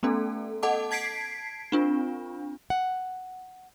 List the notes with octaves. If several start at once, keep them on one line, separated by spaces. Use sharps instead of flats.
A3 B3 C#4 A4
A4 D#5 F#5 A5 D6
A5 G#6 B6 C7 D7
C4 D4 F4
F#5